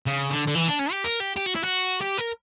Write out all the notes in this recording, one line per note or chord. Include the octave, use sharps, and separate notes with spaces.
C#3
D3
D3
E3
D4
C#4
G4
A#4
G4
G4
F#4
E4
F#4
G4
A#4